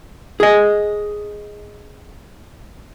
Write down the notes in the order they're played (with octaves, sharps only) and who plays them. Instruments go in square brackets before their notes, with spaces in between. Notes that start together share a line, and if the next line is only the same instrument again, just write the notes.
[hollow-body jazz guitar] G#4 D#5